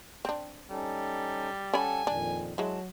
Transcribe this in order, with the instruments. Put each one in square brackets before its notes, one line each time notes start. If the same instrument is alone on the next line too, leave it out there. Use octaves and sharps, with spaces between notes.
[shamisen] C4 D4
[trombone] G3 [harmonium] C#4 D#4 A4
[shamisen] C#4 B5 [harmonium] A4 F#5 A5 [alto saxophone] G#5
[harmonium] F2 A#2 D#3 [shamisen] D4
[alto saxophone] F#3 [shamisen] G#3 E4 [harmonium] A5